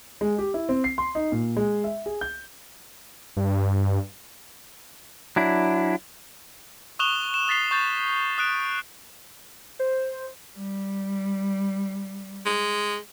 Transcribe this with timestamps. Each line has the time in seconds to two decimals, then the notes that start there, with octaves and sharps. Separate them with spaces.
0.21 G#3
0.38 G4
0.54 E4
0.69 C4
0.84 C7
0.98 C6
1.15 D#4
1.32 A#2
1.56 G#3
1.84 E5
2.06 G#4
2.21 G6
3.37 G2
5.36 F#3 D4 E4
6.99 C#6 D#6 F#6 E7 F7 G7
7.34 E7
7.48 D#6 A6 B6 C7 G7
7.71 C#6 G6 A6
8.38 D#6 F#6 D7
9.79 C5
10.57 G3
12.46 G#3